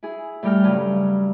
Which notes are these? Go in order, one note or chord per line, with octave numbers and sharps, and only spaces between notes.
E4 G#4
A2 G3 G5 A#5 F6
G2 C#3 F#3